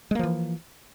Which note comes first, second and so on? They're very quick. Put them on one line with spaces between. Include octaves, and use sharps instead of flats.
G#3 A#3 F3 E3